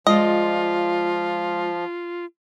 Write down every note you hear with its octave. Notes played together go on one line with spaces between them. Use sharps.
F3 G#3 F4 D5 D#5